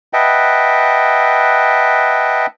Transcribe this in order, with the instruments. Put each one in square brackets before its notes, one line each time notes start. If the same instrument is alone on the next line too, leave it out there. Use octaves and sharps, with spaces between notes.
[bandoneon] B4 D#5 E5 F#5 G5 A5